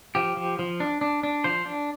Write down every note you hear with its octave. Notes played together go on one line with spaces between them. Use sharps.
F3 G4
F3
F3
D4
D4
D4
F3 C5
D4